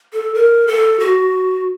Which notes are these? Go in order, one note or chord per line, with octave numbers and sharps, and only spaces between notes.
A4
A#4
A4
F#4